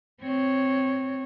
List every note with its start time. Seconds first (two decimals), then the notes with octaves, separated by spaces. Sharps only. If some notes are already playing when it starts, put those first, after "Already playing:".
0.22 C4 C#5